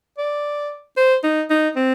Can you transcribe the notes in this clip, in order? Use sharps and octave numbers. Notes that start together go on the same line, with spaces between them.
D5
C5
D#4
D#4
C4